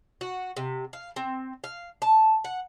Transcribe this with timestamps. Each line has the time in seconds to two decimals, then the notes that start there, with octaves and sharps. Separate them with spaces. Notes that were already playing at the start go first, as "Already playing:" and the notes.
0.21 F#4
0.57 C3
0.93 F5
1.16 C4
1.64 F5
2.02 A5
2.44 F#5